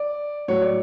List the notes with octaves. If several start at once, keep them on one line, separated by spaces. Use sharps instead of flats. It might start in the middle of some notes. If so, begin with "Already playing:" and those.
Already playing: D5
A2 F#3 C#5
D5